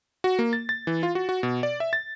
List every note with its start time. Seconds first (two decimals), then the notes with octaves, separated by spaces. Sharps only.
0.24 F#4
0.39 A#3
0.53 A6
0.69 A6
0.87 E3
1.03 F4
1.15 F#4
1.29 F#4
1.43 B2
1.63 D5
1.80 E5
1.93 A6